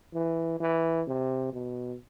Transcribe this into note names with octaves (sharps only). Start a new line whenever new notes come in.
E3
E3
C3
B2